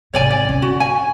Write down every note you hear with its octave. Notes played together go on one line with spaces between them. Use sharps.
G#1 C3 C#5 D5 G#5
D5
D3 C#4
F#4
G#5